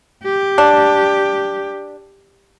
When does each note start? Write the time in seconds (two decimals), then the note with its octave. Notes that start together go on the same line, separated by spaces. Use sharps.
0.24 G4
0.58 D4